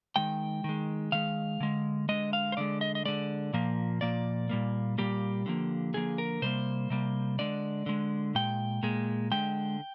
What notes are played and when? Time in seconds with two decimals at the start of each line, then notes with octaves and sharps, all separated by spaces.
0.16 D#3 G#3 G5
0.64 D#3 G#3
1.12 D#3 G#3 F5
1.60 D3 G#3
2.09 D3 G#3 D#5
2.33 F5
2.52 C5
2.57 D3 G#3 D5
2.81 D#5
2.95 D#5
3.05 D3 G#3 D5
3.53 A#2 F3 A#3
4.01 A#2 F3 A#3 D5
4.49 A#2 G3 A#3
4.98 A#2 G3 A#3 G4
5.46 D3 F3 A#3
5.94 D3 F3 A#3 G#4
6.18 A#4
6.42 C3 G3 A#3 C5
6.90 C3 G3 A#3
7.39 D3 G#3 D5
7.86 D3 G#3
8.35 A#2 G#3 G5
8.83 A#2 G#3
9.31 D3 G#3 G5